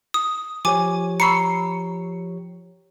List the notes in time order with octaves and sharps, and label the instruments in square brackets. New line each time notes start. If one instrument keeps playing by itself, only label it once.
[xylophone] D#6
[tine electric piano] F3 G4 C#5 [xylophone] G#5 D6
[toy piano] A#5 B5 C#6 [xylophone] E6 C7 C#7